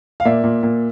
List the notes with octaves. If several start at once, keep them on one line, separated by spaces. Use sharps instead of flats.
F5
A#2 D5 E5
A#2
A#2